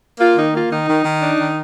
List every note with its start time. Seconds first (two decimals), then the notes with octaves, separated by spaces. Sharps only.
0.20 A#3 F4
0.37 D#3 D#4
0.54 A#3 F4
0.71 D#3 D#4
0.88 D#3
1.05 D#3
1.22 D4
1.39 D#3